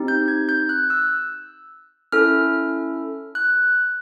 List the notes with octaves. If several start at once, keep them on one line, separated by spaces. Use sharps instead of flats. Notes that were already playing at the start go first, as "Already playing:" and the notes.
Already playing: C4 D#4 G4
G6
G#6
G6
F#6
E6
C#4 E4 A4 F6
F#6